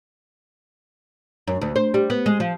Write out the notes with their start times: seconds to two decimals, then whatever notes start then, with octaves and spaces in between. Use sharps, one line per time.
1.47 F#2
1.61 D2
1.76 C5
1.94 G3
2.10 B3
2.26 G#3
2.40 F3